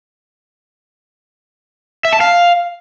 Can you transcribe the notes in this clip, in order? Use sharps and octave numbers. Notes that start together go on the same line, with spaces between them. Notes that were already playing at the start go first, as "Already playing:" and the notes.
E5
A5
F5